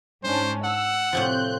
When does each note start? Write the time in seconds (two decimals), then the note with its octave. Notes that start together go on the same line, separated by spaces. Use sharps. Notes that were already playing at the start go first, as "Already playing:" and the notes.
0.24 G#2 C#4 D4 C5
0.64 F#5 E6
1.13 A2 C3 F3 C4 F#6 G6